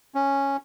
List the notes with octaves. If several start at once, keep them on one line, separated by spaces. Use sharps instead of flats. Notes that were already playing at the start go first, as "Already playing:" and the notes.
C#4